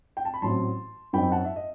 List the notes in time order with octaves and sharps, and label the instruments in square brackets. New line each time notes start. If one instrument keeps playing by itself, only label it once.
[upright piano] G5
A5
B5
A1 A2 F#3 C4 A5 C6
F#2 F#3 C4 D#4 G5 B5
F#5 A5
E5
D#5